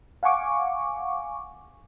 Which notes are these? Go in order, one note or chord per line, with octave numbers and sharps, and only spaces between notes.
F5 F#5 G#5 C#6 D6